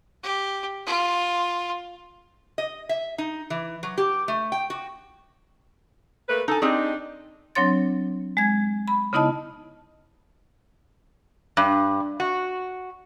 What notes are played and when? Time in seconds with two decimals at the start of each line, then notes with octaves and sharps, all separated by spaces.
0.24 G4
0.86 F4
2.58 D#5
2.89 E5
3.18 D#4
3.50 E3
3.83 F#3
3.98 G4
4.28 A3
4.52 G5
4.70 F#4
6.29 A3 A#3 B4
6.48 D#4 A4 G#5
6.62 C4 D4 D#4 G4 G#4
7.55 F#3 C4 D4 C#5 C6 A6
8.37 G#3 G#6
8.88 B5
9.13 C#3 B3 D#4 E4 D#5 A5
11.57 G2
12.20 F#4